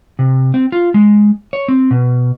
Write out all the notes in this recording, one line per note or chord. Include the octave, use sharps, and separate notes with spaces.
C3
C4
F4
G#3
C#5
C4
B2